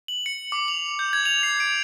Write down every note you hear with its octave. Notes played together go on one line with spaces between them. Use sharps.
F#7
C#7
D6
F7
G6
G#6
F7
C7
D7